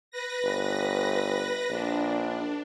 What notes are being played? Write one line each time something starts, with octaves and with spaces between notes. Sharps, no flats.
B4 A#6
G1
A#1 D4